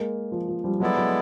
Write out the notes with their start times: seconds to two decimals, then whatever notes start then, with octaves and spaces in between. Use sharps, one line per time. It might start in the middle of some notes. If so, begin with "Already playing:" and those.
Already playing: G#3 A#3
0.32 F3
0.49 F3
0.64 F3 G3
0.80 F#3 G#3 B3 E4 A4 D5
0.97 F#3